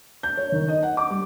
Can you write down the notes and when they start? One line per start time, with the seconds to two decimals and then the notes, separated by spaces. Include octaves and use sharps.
0.23 G6
0.37 C#5
0.52 D#3
0.68 D#5
0.83 F#5
0.97 D6
1.10 G3